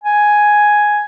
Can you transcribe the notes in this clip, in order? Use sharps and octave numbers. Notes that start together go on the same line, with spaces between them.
G#5